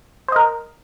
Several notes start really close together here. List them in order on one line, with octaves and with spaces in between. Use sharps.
C5 D#5 A#4